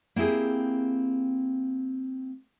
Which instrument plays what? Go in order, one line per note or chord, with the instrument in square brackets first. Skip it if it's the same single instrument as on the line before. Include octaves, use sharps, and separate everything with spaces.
[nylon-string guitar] A#3 C4 E4 G4 G#4